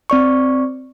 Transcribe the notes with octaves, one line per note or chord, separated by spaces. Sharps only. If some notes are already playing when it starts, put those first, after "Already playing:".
C4 D5 C#6